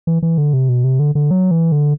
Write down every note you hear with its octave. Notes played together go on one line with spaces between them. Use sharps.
E3
E3
D3
C3
B2
C3
D3
D3
F#3
E3
D3